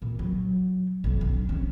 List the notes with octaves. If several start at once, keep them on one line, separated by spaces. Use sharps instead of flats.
A#2
F#3
F#1 B1
D4
F3 C#4